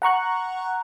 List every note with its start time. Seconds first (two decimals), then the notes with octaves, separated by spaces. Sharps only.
0.02 F#5 A#5 C#6 F#6